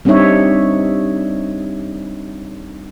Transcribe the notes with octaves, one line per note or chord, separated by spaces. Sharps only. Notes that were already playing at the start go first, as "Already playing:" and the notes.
G3 C4 D4 D#4 C#5 E5